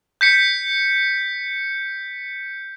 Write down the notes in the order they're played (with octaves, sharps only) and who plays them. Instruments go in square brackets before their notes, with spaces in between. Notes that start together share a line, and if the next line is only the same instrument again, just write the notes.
[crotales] G6 B6 C#7